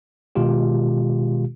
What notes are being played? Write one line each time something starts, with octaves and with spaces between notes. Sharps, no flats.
B2 D#3 G#3 F4 G4